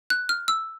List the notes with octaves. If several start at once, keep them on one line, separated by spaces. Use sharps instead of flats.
F#6
F6
E6